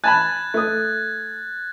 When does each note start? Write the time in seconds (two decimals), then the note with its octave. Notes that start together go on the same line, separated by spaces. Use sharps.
0.04 G#5 A5 B5 F#6 G#6 A6
0.54 A3 D#6